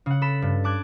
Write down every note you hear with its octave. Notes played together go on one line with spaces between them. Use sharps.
C#3 F#5
A4 B5 E7
G2
A5 D6 F#6 G#6